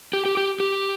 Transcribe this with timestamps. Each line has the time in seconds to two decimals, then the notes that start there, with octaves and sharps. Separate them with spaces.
0.13 G4
0.25 G4
0.37 G4
0.60 G4